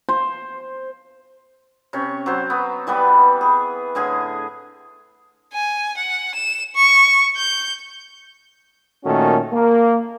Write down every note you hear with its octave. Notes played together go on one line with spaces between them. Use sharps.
C5
C3 C#4 C#5
F#3 C5
B3
E3 G3 B3 B4
G#4
A2 D3 G#4 G#5
G#5
F#5
E7
C#6
G6
A#2 D#3 A3 C#4 F#4 A4
A#3